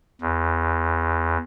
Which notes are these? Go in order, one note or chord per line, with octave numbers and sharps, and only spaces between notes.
E2